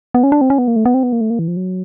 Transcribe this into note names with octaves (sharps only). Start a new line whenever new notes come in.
B3
C#4
D4
C4
C#4
B3
A#3
A3
B3
C4
B3
A#3
A3
A#3
E3
F3
F#3